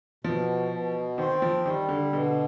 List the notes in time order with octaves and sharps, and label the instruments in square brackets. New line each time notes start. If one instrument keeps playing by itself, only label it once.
[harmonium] B2 [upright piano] F3
[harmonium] B2
[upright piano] D#3 [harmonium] C4
[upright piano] F3
[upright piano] D#3 [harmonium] G3
[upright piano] D3
[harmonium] B2 [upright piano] D3